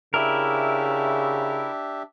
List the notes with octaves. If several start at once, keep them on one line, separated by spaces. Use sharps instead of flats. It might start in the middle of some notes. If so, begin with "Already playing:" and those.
C#3 D4 E4 G4 A#4 E5